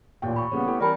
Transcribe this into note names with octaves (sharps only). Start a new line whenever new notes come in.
A1 D#2 A#2 G5
B5 C#6
A#2 C#3 G3 B3 C#5
A3 E4 G4
E3 G3 C4 A#4 D5 G5 A5 B5